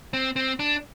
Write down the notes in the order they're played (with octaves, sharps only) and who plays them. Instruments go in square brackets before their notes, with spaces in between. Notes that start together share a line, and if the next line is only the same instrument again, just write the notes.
[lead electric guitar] C4
C4
D4